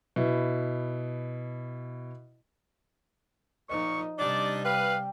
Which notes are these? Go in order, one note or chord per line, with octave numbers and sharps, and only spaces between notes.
B2 E4
A#2 F3 D#4 D#5 C#6
C3 G3 D4 D#4 D5
B4 F5 G5